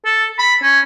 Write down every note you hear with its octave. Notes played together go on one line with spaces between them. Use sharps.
A4
B5
C#4